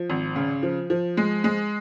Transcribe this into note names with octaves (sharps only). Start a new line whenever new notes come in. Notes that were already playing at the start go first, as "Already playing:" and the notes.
Already playing: F3
G#1
C#3
F3
F3
G#3
G#3